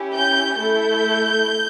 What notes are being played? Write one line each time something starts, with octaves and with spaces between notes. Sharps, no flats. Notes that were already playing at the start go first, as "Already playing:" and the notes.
Already playing: C#4 E4 G4
G6
A3 E4 A4 G6